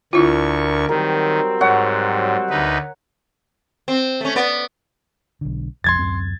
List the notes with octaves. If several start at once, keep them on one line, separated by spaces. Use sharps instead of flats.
D2 D4 E4 F4 A#4 C#6
D#3 F#3 G3 C4 A#4
G#2 C#5 F#5
D2 D#4 B4
C4
A3 C#4
B3 D5
B1 D3
F1 A#1 F2 C6 G#6 A6
D1 F#2 C4